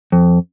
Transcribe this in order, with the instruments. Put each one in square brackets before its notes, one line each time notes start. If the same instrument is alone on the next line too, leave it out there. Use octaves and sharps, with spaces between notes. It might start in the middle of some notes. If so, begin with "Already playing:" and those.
[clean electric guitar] F2